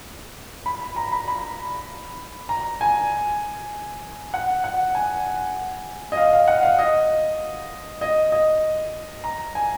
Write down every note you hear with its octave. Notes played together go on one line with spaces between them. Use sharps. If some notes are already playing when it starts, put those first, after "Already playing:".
B5
B5
A#5
B5
B5
A#5
G#5
F#5
F#5
G#5
D#5
F5
F5
F#5
F5
D#5
D#5
D#5
A#5
G#5